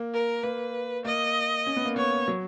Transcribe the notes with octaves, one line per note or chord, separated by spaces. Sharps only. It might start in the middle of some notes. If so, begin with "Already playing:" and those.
Already playing: A#3
A#4
A#3 B4
A#3 D#5
C#4
B3
A#3
B3 C#5
F#3